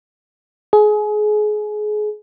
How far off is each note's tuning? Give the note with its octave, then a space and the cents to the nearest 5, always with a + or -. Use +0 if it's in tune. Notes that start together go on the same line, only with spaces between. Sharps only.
G#4 +25